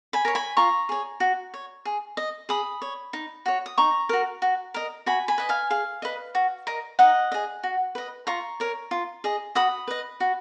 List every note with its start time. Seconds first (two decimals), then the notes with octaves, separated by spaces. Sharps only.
0.13 G#5 B5
0.25 A#4 C#5
0.35 G#5 B5
0.57 F4 A#5 C#6
0.89 G#4 C#5
1.20 F#4
1.54 C#5
1.85 G#4
2.17 D#5
2.49 G#4 B5 D#6
2.82 C#5
3.13 D#4
3.46 F#4 C#5
3.66 D#6
3.78 D#4 A#5 C#6
4.09 F#4 A#4
4.42 F#4
4.74 A#4 D#5
5.06 F#4 G#5 B5
5.28 G#5 B5
5.38 B4 D#5
5.49 F5 G#5
5.70 G#4 F5
6.02 B4 D#5
6.35 F#4
6.67 A#4 D#5
6.99 D#4 D#5 F#5
7.32 G#4 D#5
7.63 F#4
7.95 B4 D#5
8.27 F4 A#5 C#6
8.60 A#4 C#5
8.91 F4
9.24 G#4 D#5
9.55 F#4 B5 D#6
9.88 B4 D#5
10.20 F#4